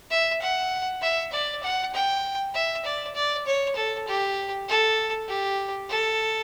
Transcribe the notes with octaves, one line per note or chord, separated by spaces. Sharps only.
E5
F#5
E5
D5
F#5
G5
E5
D5
D5
C#5
A4
G4
A4
G4
A4